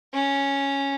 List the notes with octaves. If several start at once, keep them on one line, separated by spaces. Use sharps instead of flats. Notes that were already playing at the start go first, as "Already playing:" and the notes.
C#4